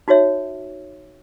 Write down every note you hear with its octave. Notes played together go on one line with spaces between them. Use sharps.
D#4 F#4 C#5 E5